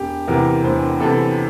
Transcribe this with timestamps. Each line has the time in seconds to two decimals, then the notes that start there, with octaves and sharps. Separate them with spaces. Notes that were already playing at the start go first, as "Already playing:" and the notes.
Already playing: E1 G4
0.27 E2 C3 E3 A#4
0.64 E1 C5
1.00 E2 C3 E3 A4